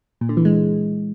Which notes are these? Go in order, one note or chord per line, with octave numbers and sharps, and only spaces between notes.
A#2
D3
E3
G#3